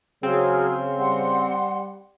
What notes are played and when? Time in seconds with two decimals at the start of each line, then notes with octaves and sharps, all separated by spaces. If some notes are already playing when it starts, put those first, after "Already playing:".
0.23 C#3 F#3 C4 G#4 F6
0.99 G3 F#5 C6